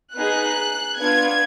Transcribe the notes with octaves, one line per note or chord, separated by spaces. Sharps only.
B3 D#4 G#4 F#6
B3 D4 F4 G#6